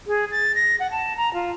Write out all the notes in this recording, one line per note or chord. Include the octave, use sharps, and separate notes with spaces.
G#4
A6
A#6
F#5
A5
A#5
F4